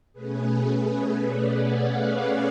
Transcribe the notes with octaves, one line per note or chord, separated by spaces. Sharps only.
B2 A3 C#4 G#4 B4
B4 D5
D5 F#5
C#5 F5
B4 D5